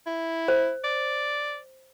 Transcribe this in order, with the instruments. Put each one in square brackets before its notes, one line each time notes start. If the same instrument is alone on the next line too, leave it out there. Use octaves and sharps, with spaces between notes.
[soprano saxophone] E4
[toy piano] C5
[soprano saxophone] D5